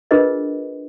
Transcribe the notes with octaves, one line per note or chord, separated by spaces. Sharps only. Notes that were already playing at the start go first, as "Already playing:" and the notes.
D4 F4 G#4 A#4 B4 D#5